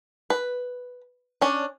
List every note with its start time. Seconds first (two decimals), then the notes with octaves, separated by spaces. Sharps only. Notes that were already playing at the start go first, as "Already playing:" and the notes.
0.30 B4
1.41 C#4 D4